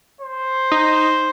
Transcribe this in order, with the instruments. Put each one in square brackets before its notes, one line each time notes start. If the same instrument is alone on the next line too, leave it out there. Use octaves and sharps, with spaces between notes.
[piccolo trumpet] C5
[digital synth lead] D#4